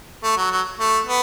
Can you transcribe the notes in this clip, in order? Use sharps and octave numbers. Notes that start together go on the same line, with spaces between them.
A3
F#3
F#3
A3
B3